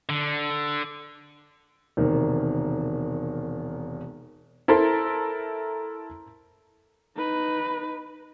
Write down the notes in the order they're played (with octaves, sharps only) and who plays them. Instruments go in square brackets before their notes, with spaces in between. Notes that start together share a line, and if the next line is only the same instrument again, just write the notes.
[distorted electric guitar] D3
[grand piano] E1 C3 D#3 A#3
[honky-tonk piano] E4 A4 A#4 [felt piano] C5 A#5 C6
[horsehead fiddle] D#4 B4